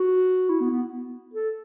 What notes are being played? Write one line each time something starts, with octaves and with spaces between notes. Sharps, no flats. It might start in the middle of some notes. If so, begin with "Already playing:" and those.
Already playing: F#4
E4
B3
B3
A4